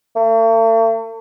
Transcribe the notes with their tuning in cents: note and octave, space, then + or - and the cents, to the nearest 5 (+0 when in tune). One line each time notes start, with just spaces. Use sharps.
A3 +45